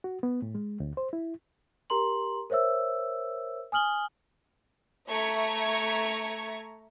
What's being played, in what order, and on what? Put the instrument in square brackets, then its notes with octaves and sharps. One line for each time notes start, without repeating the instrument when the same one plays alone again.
[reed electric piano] F#4
B3
A2
G#3
D2
C5
E4
[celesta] G4 A#4 A#5 C6 F#7
A#4 C5 C#5 E5 E6
G#5 D#6 F6 F#7 G7
[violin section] A3 E5 A#5 C#6 G#6